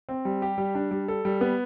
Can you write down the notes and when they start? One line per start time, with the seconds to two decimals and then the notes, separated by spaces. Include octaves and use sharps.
0.09 C4
0.25 G3
0.42 G4
0.58 G3
0.75 D4
0.91 G3
1.08 A4
1.25 G3
1.41 B3